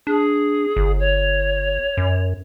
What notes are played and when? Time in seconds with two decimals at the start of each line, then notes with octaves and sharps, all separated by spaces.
0.07 D4 G#4
0.76 G1
0.99 C#5
1.97 F#2